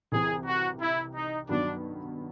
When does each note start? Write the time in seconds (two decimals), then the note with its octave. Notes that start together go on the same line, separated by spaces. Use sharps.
0.12 C2 C3 E3 G#4
0.46 F#4
0.81 E4
1.15 D#4
1.49 G2 D#3 F#3 B3 D4